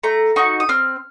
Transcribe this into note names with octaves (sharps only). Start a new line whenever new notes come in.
A3 A#5
D#4 F#4 C#6
D#6
C4 F6